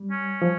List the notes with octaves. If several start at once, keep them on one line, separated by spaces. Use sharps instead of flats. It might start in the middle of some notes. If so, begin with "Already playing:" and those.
Already playing: G3
C#4
F3